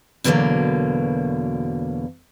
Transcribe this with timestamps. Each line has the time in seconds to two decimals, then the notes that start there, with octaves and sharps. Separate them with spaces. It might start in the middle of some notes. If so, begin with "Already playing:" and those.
0.24 E2 B2 D3 F#3 A3 A#3